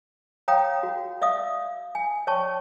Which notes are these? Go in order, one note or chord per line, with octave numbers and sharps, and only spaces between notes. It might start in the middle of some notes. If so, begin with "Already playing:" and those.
C#5 F5 G5 A#5 D#6
F#4
D5 E5 F5 D#6
G#5
C#5 D5 G5 A5 C#6